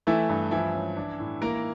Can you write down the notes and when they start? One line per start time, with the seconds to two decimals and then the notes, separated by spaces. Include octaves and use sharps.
0.07 E3 A3 E4
0.29 G2
0.51 E3 F3 E4
0.74 C#4
0.97 D4
1.20 A2
1.42 E3 A#3 A#4